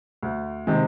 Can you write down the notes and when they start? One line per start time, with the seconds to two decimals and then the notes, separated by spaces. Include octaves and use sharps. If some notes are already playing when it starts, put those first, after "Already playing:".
0.23 D2
0.67 C3 D#3 G#3